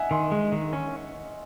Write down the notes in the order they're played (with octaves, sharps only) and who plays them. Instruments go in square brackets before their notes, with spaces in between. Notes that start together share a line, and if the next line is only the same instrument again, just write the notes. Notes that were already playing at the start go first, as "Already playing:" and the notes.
Already playing: [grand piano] D#5 E5 F#5 G#5
[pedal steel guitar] D#3 [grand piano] G#5 C6
[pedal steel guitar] G#3
D#3
C#4